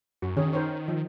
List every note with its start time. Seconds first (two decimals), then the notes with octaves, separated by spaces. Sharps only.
0.22 F#2 F#4
0.37 D#3 C#4 G#4 C#5
0.53 A#4 C5 C#5
0.88 F3